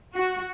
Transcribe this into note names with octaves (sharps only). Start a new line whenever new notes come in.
F#4